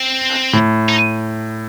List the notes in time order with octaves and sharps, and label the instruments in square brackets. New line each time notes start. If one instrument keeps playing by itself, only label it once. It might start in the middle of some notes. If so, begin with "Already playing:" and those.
Already playing: [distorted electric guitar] C4
[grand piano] A2
[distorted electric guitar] D#4